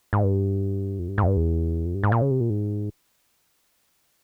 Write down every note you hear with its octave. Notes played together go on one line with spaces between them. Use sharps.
G#2
G2
F2
G2
G#2
F2
G2
E2
F2
G2
G#2
A#2
C#3
C3
A#2
G#2